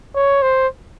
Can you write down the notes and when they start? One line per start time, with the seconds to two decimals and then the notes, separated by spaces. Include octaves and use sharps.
0.15 C#5
0.42 C5